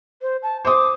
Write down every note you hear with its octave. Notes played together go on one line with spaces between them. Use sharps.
C5
A5
C5 C6 D6 D#6